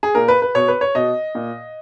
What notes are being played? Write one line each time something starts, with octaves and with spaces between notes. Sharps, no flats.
G#4
A#2 A#4
B4
B4
B2 C#5
B4
C#5
B2 D#5
A#2